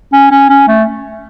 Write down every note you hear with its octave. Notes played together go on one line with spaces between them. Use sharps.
C#4
C#4
C#4
A3